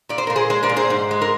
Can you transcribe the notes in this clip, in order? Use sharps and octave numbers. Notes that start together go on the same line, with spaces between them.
A#2 D5
C5
A#2 A#4
G#4 C5
G#3 G#4 C5
A#4 D5
A#2
G#4 C5
G#2
G#3
A#4